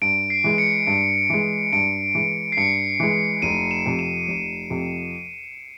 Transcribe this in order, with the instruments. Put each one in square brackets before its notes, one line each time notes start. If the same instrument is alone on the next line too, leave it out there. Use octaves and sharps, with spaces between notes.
[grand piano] G2 [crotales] D7
[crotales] C7
[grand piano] E3 G#3
[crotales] C#7
[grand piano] G2 [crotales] D7
[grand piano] E3 G#3
[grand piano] G2 [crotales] D7
[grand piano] E3 G#3
[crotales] C7
[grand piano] G2 [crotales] C#7
[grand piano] E3 G#3
[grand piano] F1 [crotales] D#7
[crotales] E7
[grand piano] F2 C3
[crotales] E7
[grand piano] F1
F2 C3